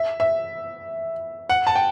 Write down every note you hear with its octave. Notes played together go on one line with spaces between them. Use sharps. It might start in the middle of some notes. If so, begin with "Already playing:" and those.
Already playing: E5
E5
F#5
A5
G5